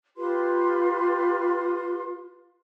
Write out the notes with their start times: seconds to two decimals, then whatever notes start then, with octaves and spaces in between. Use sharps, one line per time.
0.18 F4 G4 B4 C6